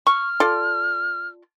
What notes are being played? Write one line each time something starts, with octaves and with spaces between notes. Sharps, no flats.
C#6 F6
F4 A4 D5